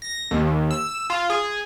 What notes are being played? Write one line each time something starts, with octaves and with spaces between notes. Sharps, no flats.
A#6
D#2
E6
F4
G#4